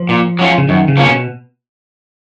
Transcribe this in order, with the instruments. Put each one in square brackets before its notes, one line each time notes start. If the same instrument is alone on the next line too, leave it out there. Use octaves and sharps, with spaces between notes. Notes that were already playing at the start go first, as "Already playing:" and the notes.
Already playing: [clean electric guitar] F3
[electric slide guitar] A#2
F#3 C#4 F4
[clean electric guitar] C#3
[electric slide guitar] F#2 [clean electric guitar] D#3
[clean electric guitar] C#3
[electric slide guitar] F3 A#3 C#4
[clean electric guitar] B2